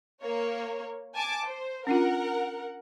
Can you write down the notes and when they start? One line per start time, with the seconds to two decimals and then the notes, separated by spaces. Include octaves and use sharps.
0.22 A#3 C#5
1.15 G#5 A5 D6
1.46 C5
1.87 C#4 D4 F4 A#4 F#5